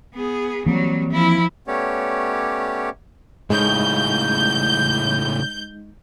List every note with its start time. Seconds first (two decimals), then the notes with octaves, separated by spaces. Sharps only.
0.14 B3 G#4
0.66 E3 F#3 G3 A#3 C4
1.11 F3 E4
1.67 A3 B3 C#4 G4 C#5 D5
3.50 A2 C#3 G#3 D#4 D#5 G6